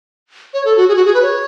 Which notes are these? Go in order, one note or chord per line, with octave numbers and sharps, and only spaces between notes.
C#5
A4
F#4
G#4
F#4
G#4
B4
C#5